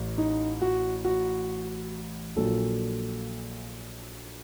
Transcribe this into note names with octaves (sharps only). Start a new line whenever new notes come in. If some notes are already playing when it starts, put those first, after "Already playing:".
Already playing: A1 A2
D#4
F#4
F#4
A#1 A#2 F#3 A4